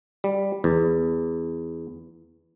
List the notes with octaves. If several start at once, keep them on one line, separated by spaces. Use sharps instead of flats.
G3
E2